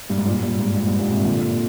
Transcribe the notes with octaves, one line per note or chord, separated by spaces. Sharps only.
G2
G#2
G2 A#2
G2 A#2
G#2
G2
G#2
G2 A#2
G#2 C3
A#2 D3